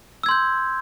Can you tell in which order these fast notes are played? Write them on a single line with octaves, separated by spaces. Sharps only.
E6 G#6 C6 G6